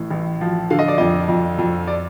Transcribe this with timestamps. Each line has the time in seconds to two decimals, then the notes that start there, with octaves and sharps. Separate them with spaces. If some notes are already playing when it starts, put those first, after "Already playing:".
Already playing: A1 A2
0.10 A1
0.41 F3
0.70 D3 F5
0.79 D#5
0.88 D5
0.98 F2 D#5
1.28 F2
1.59 F2
1.87 D5